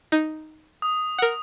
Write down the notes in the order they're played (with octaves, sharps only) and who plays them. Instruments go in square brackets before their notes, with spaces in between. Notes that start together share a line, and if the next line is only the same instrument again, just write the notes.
[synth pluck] D#4
[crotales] D#6
[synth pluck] A#4 F#5